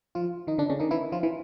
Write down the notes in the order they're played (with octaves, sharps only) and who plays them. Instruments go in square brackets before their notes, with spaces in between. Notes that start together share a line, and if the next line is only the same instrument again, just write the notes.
[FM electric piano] F3 F4
D#3 D#4
D3 D4
C#3 C#4
D#3 D#4
E3 E4
F3 F4
E3 E4